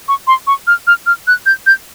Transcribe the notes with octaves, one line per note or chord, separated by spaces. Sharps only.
C#6
C6
C#6
F6
F6
F6
F#6
G6
G6